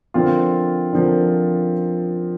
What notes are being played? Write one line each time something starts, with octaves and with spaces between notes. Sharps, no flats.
D3 F3 C4 F4 A#4
D3 F3 C4 F4 A#4